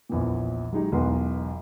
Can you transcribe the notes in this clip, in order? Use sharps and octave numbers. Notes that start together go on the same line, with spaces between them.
A#1 E2 A#2
F#3 G#3 D#4 G4
E1 B1 E2 B3 F#5 C6